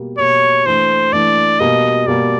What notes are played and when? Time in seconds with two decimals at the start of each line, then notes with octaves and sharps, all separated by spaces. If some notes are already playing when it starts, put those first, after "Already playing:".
Already playing: B2 G3 A#3
0.19 B2 G3 A#3 C#5
0.66 E3 A3 D4 C5
1.13 E3 A3 D4 D5
1.60 B2 G3 A#3 D#5
2.07 B2 G3 A#3 D5